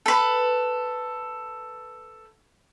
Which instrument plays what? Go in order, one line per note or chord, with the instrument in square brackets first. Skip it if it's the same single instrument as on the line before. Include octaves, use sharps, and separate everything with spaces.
[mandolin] A4 B4